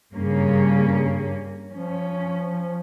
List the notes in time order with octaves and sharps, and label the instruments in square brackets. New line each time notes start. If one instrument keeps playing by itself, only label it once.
[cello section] G2 A#3 C#4 [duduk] C#3
[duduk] F3 [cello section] C#4